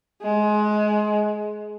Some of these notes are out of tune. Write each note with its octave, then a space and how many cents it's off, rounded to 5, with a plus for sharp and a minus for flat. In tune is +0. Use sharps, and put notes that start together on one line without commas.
G#3 +20